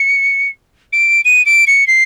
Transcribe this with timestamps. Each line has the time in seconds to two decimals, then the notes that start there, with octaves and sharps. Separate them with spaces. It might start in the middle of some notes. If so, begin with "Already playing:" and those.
Already playing: C#7
0.92 D7
1.25 D#7
1.45 D7
1.67 C#7
1.87 C7